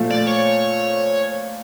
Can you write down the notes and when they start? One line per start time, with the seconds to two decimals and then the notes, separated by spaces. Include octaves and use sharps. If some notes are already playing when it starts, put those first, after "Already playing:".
Already playing: A#2 F3 A3
0.11 D5
0.27 C#5